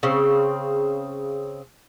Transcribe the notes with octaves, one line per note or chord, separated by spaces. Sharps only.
C#3 C4